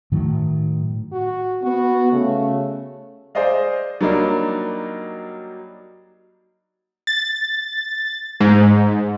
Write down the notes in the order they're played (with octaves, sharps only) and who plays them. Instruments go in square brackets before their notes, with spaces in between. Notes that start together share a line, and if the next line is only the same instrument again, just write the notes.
[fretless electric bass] A2 D#3 F#3
[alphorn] F#4
[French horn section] B3 [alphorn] F#4
[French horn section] C#3 [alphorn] A3
[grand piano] G#4 C5 D5 D#5 F5
F#3 G3 A#3 D4 D#4
[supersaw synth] A6
G#2